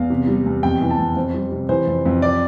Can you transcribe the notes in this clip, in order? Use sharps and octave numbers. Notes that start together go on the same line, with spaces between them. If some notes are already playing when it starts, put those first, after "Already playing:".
Already playing: E2 F5
C3
G3
E2
F2 G5
E3
A5
F2
F2 C5
G3
C3
E3 C5
F2
F2
D5